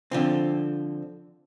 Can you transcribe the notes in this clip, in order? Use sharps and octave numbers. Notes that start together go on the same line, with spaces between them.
D3 F3 C4